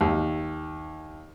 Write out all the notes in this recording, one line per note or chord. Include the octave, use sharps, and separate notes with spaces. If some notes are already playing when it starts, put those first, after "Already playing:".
D#2